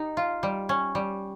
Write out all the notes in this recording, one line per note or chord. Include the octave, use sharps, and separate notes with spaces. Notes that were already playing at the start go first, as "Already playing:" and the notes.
Already playing: D#4 G4
F4
G3
C#4
G3